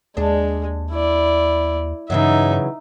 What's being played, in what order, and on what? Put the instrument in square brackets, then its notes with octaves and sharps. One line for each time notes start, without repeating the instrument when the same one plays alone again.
[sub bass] D#2 [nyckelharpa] G#3 [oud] D4
[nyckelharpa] E4 D5
[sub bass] G2 [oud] C#3 E3 F#3 [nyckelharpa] D#4 E5